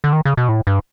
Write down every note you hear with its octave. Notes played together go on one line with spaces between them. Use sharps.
D3
D#3
C#3
B2
A2
G2